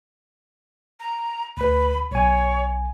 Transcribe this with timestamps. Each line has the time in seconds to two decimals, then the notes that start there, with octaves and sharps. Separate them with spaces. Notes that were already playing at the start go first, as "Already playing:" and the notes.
1.00 A#5
1.57 D2 B4 B5
2.11 B1 C#5 G#5